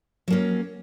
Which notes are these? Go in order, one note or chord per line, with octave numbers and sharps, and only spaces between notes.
F#3 A#3 C#4